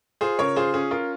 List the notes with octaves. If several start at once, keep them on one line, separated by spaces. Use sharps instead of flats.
F4 G#4 C5
C#3 A#4 C#5
F4 G#4 C5
C#4 G#4
F4 A#4